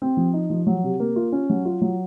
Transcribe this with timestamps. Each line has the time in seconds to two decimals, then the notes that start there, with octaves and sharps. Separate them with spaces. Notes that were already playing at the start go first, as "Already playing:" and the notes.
0.02 C4
0.17 F3
0.33 D#4
0.50 F3
0.67 F#3
0.84 C3
1.00 A#3
1.16 F4
1.32 C#4
1.50 F#3
1.65 F4
1.82 F#3